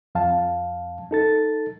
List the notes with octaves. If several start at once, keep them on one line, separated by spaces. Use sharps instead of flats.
F2 F5 A5
D#4 A4 A6